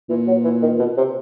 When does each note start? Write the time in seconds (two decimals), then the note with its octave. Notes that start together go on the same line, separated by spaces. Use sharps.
0.09 A#2 E3
0.27 F#3
0.44 E3
0.62 D#3
0.79 B2
0.97 C3